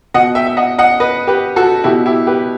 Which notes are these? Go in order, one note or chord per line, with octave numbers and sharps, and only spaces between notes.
B2 D#5 F#5
E5 G5
E5
D#5 F#5
D#5 F#5
B4 D#5
G4 B4
F#4 A4
B2 E4 G4
E4 G4
G4 B4